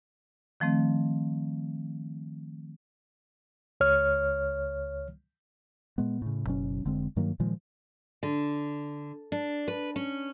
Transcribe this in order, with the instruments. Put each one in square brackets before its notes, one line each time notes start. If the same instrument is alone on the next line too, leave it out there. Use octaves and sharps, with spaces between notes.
[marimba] D#3 F3 A3 C4
[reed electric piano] C#2 C#5 F6
[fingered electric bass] A#2 G#3 B3
A2 C#3
F#1 B2 F#3 C#4
F1 D3 G#3 C4
G2 D#3 F#3 A#3
A#2 D#3 F3 G#3
[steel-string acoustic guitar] D3
D4
B4
C#4